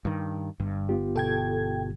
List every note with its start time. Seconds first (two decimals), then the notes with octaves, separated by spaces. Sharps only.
0.05 G2 D#3
0.60 G1 G2
0.89 B3 F4 G4
1.16 B2 A4 G5 G#6